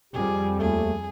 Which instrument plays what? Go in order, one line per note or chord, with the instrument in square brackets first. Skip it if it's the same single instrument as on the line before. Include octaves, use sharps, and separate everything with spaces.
[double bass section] F2 G3 [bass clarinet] G4 [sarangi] G#4
[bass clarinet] D#2 [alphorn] A3 [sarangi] G#4